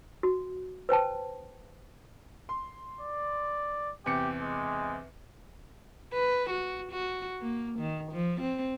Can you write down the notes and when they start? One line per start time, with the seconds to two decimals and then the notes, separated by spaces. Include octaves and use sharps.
0.23 F#4
0.89 B4 C5 G5 A5
2.49 C6
3.01 D5
4.06 E2 C3 G4 C#7
4.41 G#3
6.13 B4
6.50 F#4
6.91 F#4
7.41 A#3
7.79 D#3
8.12 F3
8.40 C4